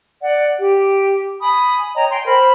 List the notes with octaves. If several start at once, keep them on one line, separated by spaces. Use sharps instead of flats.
D5 F#5
G4
G#5 B5 D#6
C#5 D#5 G5 A#5
G5 G#5 C6
A#4 C5 B5